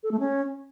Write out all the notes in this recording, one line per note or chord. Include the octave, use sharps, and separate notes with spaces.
A4
A3
C#4